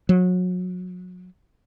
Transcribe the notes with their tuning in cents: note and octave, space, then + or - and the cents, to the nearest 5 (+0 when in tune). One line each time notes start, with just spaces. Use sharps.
F#3 -30